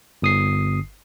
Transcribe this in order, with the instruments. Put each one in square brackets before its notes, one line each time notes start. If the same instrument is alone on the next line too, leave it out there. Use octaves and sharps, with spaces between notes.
[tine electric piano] G1 D#6 C7